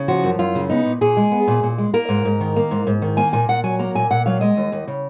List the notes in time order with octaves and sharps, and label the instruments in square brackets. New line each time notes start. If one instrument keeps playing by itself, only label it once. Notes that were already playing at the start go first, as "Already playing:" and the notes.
Already playing: [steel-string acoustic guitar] C#3
F3 F#4
F#2
F#2 F4
C#3
B3 D#4
A#2
A#2 G#4
G#3
B3
A#2
A#2
G#3
A#3 A#4
G#2
G#2
D#3
A#3
G#2
G#2
D#3
A#3 G#5
A#2 G#5
A#2 F#5
F#3 G#5
A#3 A#5
A#2 G#5
A#2 F#5
F#3 F5
G#3 D#5
D#2
D#2
C#3